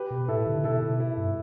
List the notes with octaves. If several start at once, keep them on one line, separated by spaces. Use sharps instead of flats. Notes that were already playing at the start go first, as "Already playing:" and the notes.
Already playing: G4 B4
B2
A2 E4 A4
D3
B2 E4 A4
B2
E4
G2